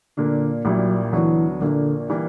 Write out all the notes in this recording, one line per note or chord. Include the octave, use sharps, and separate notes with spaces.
A#2 D3 A#3 D4
A#1 A#2 F#3 G3 A#3 E4
D2 D3 E3 F#3 B3 F#4
A#1 A#2 D3 A#3 D4
E3 G3 A#3